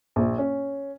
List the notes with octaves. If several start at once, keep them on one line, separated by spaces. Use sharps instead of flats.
A#1
C#4